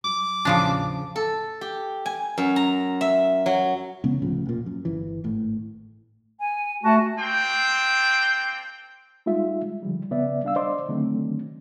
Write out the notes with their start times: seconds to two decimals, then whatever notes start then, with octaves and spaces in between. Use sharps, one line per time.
0.04 F#3 D6
0.45 A1 E2 C#3 F3 D4
1.16 A4
1.61 G4
2.06 G#5
2.38 F#2
2.56 A#5
3.01 E5
3.46 F#3
4.04 C#3 G#3 B3 C#4
4.22 D1 A2 C#3 F3
4.46 E1 A#2
4.66 F#2
4.85 G1 E3
5.24 G#1 A2
6.39 G#5
6.83 A3 F#4 A5
7.18 A#3 C4 D4 G5
9.26 G3 G#3 D#4 F4 E5
9.83 D3 F3 G3
10.11 C2 C#3 B3 D5 E5
10.43 G3 D4 F5 E6
10.56 D4 C5 D5 D#5 C6 D6
10.89 D3 D#3 F#3 A3 C4 D4